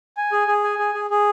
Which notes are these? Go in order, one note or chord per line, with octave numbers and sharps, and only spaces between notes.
G#5
G#4
G#4
G#5
G#4
G#4
G#4